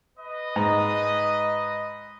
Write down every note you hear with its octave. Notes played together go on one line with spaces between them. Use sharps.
B4 D#5
G#2